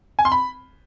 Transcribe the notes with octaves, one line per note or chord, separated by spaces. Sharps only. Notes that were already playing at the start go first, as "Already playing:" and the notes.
G#5
C6
B5